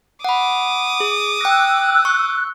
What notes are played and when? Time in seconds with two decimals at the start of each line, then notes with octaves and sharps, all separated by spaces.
0.24 F#5 B5 D6 D#6
1.00 G#4
1.41 G5 E6 F#6 A#6
2.05 C#6